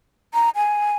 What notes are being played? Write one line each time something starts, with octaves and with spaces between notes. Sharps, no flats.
A#5
G#5